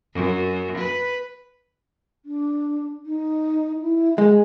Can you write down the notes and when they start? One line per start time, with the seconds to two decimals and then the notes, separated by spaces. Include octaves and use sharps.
0.14 F#2
0.78 B4
2.25 D4
3.06 D#4
3.82 E4
4.18 G#3 G#5